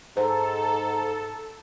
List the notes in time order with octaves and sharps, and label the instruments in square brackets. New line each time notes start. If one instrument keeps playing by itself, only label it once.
[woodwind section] G#2 [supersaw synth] A4 [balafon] C5 [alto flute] A#5